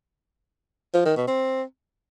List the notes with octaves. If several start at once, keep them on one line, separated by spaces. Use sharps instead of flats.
F3
D#3
B2
C4